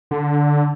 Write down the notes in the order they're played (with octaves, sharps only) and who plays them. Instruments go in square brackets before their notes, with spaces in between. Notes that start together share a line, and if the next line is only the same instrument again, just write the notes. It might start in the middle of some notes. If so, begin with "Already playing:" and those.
[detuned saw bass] D3